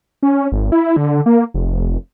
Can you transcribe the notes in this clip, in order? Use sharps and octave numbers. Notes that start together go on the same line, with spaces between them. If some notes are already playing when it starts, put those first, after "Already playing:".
C#4
G#1
E4
D3
A#3
F1